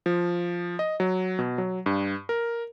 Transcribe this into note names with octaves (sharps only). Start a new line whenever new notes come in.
F3
D#5
F#3
B2
F#3
G2
A#4